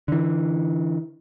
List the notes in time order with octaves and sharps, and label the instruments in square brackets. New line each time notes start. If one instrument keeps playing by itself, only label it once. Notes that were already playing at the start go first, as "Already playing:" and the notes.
[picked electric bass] D3 E3